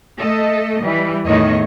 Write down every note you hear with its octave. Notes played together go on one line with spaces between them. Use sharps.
A3 A4 D#5
E3 G3
E2 A2 D#3 C#5 D#5